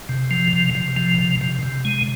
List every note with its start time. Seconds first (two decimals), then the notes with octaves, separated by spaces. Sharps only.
0.09 C3
0.31 F3
0.53 C3
0.75 C3
0.96 F3
1.18 C3
1.41 C3
1.63 C3
1.85 G#3